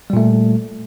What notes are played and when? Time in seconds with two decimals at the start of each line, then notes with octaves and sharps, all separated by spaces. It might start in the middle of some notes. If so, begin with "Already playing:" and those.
0.10 G3
0.13 A#2
0.17 A3